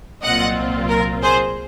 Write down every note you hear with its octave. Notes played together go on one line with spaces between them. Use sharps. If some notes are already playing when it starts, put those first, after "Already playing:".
C2 A#2 F#3 C4 F4 D#5 F#5
A#4
G#4 C5